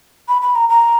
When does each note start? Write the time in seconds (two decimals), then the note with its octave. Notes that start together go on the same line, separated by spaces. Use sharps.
0.29 B5
0.42 B5
0.55 A#5
0.69 A#5